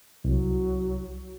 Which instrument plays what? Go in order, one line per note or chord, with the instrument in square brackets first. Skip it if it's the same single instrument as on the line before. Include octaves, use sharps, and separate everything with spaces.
[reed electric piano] C2 [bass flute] F#3